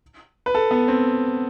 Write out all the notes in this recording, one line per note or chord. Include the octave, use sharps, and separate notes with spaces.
B4
A4
B3
C4